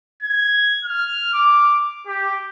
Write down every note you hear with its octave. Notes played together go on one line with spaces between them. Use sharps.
G#6
F6
D6
G4